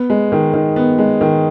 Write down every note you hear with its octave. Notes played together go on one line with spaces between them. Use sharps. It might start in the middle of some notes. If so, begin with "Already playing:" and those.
Already playing: B3
G#3
D#3
D#3
B3
G#3
D#3